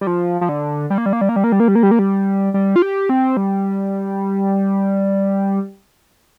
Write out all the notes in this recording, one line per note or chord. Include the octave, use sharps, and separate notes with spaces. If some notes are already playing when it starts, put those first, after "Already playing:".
G3
F3
F3
D3
G3
A#3
G3
A#3
G3
A#3
G3
A#3
G3
A#3
G3
A#3
G3
A#3
G3
G3
F4
G4
C4
G3